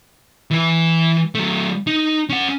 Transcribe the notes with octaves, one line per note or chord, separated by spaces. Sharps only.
E3 B4
F#3 A3
D#4
C#4 F#5